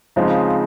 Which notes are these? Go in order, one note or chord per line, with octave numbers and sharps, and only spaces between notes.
C#3 F3 G#3 C4 D#4